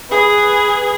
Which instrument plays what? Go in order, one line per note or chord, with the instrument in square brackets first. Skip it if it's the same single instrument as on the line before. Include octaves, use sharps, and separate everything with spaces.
[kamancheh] G#4 [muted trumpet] B4